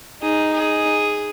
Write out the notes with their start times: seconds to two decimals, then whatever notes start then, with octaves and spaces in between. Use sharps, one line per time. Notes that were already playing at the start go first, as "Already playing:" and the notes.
0.22 D#4 G#4
0.53 G#4